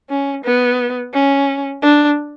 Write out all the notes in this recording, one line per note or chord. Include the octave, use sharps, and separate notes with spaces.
C#4
B3
C#4
D4